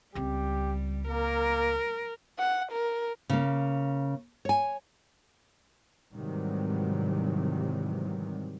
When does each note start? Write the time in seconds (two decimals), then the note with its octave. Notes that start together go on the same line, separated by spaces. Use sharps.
0.15 C#2 G3 C4 G4
1.09 A#3 A#4
2.39 F#5
2.72 A#4
3.30 C#3 A#3
4.45 C#5 G#5
6.13 G#2 C3 D#3 E3 F#3 G3